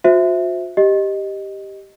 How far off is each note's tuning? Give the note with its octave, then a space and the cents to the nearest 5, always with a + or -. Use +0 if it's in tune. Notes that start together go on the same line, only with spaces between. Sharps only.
F#4 -45 C5 -5 E5 +0
G4 +0 D#5 -5